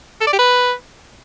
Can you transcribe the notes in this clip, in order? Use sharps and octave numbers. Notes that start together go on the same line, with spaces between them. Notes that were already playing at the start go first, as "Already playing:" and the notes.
A4
D5
G4
B4